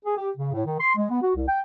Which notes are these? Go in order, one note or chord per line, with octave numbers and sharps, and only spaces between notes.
G#4
G4
C#3
A2
D#3
C6
G#3
B3
F#4
C2
G5